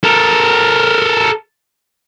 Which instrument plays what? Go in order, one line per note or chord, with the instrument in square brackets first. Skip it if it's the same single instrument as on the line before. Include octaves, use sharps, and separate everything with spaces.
[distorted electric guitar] A4 A#4